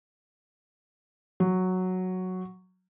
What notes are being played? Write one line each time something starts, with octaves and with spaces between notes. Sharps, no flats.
F#3